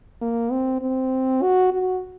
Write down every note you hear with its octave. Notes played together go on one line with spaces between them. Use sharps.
A#3
C4
C4
F#4
F#4